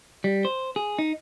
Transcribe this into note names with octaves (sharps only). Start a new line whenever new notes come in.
G3
C5
G#4
D#4